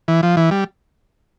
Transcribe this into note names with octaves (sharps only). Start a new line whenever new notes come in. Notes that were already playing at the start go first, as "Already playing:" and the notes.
E3
F3
E3
G3